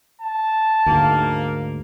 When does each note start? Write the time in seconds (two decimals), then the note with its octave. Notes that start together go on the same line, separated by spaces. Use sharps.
0.21 A5
0.86 D2 G#2 A#3